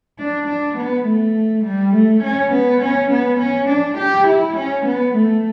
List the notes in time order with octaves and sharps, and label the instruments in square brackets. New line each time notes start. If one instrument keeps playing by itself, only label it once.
[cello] D4
D4
B3
A3
G3
A3
C#4
B3
C#4
B3
C#4
D4
G4
E4
C#4
B3
A3